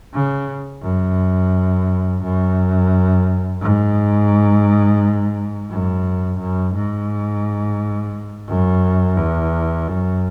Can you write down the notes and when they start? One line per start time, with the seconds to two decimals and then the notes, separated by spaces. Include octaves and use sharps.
0.14 C#3
0.83 F#2
2.23 F#2
3.61 G#2
5.70 F#2
6.39 F#2
6.74 G#2
8.48 F#2
9.17 E2
9.88 F#2